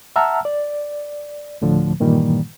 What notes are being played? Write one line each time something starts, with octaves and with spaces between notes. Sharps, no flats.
E5 F#5 A5 A#5 E6 F6
D5
D2 A2 D3 F3 A3
G2 A#2 D#3 E3 G3 A#3